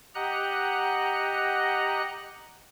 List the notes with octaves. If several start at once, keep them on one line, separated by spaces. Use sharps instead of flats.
G4 D#5 F#5 A#5 F#6